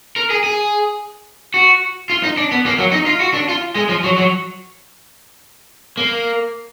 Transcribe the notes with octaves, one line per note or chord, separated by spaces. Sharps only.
A#4
G#4
G#4
F#4
F4
D#4
D4
B3
A#3
F#3
D#4
F4
F#4
D4
F4
G#3
F3
F#3
F#3
A#3